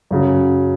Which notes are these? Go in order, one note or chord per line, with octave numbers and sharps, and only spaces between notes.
F#2 C#3 F#3